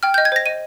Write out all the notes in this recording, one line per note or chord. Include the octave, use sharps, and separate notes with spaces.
G5 F6
G6
D#5
G#6
C5 A#6
D#5 D#7